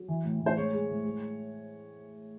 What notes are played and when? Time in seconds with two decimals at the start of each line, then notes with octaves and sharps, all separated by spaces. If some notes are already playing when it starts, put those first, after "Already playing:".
Already playing: F#3
0.08 E3
0.24 A2
0.41 A2
0.46 C5
0.56 G#3 C#5
0.73 G#3
0.89 A2
1.05 G#3